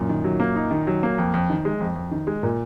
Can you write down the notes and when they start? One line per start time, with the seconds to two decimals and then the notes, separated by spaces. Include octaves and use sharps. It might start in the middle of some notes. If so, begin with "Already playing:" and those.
Already playing: F#2 A#2
0.09 D#3
0.24 F#3
0.40 A#3
0.56 D#4
0.71 D#3
0.87 F#3
1.03 A#3
1.18 F2
1.34 F2
1.50 D#3
1.65 G#3
1.80 F2
1.96 F2
2.11 D#3
2.27 G#3
2.43 A#2